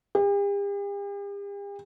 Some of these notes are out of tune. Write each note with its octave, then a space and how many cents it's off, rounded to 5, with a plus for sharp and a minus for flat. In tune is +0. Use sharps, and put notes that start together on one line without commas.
G4 +45